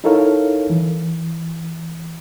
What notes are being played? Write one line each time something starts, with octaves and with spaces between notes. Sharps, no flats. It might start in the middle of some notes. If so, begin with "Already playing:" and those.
D#4 E4 A4 A#4 C#5 F5
E3